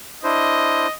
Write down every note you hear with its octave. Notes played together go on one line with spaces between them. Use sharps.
D4 E4 C5 D#5